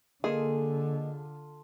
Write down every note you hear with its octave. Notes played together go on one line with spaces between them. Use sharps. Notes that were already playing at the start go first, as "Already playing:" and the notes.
D3 A#3 F4 G#4 A4 D#5